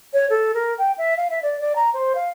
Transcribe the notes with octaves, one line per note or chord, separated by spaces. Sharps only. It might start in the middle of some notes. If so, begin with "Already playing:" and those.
C#5
A4
A#4
G5
E5
F5
E5
D5
D5
A#5
C5
F5